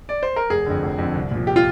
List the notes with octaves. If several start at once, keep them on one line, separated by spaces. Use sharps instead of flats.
D5
C5
A#4
F1 G#4
F2 D3
F1
F2 D3
C2
A#2 F3
G4
F4